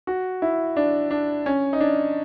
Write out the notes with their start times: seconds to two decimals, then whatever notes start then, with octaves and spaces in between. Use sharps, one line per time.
0.07 F#4
0.42 E4
0.76 D4
1.11 D4
1.46 C#4
1.73 D#4
1.80 D4